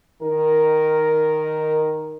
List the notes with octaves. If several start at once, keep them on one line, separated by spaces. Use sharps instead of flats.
D#3 A#4